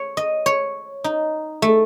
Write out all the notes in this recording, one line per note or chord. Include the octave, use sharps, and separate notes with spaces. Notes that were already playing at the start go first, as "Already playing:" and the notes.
Already playing: C#5
D#5
C#5
D#4
A3